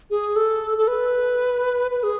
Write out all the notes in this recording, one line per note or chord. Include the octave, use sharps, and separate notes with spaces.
G#4
A4
A4
B4
B4
G#4